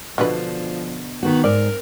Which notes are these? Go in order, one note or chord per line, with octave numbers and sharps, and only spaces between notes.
B2 D3 F3 F#3 B4
D#3 B3 F#4
G#2 C4 A#4 D5